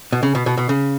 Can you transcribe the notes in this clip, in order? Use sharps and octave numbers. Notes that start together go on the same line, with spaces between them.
B2
C#3
B2
B2
B2
C#3